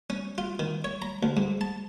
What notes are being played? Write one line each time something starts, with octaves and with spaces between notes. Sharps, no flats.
C#4
F4
D#3
C#5
A#5
D2
G#2
A5